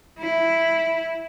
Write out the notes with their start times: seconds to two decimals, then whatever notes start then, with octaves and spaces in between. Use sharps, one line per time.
0.19 E4